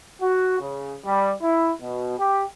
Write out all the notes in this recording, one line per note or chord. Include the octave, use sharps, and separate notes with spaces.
F#4
C#3
G3
E4
B2
G4